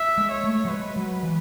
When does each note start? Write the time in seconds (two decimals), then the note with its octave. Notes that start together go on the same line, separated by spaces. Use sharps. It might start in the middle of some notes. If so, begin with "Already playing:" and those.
Already playing: E5
0.18 G#3
0.31 C#5
0.44 A3
0.65 F#3
0.70 G#3 B4
0.96 F#3
1.23 E3